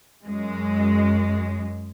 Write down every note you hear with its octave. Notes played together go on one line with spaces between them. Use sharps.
F#2 G#3